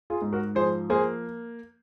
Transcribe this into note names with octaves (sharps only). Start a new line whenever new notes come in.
F4 G#4
G#2
F#4 A#4
F3 G#4 C5
A#3 G#4 C5